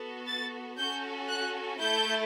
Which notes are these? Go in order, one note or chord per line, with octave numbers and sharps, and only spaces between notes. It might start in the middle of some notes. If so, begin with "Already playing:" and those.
Already playing: B3 F#4 A4
A6
C#4 F#4 A4 G6
F#6
A3 E4 A4 G6